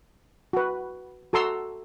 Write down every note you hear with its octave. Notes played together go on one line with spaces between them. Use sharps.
F#4 B4
F#4 A4 A#5 C6 E6